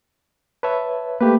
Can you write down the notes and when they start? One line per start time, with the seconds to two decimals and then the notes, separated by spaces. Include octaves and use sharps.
0.63 B4 C#5 E5 A5
1.20 A3 A#3 G4 B4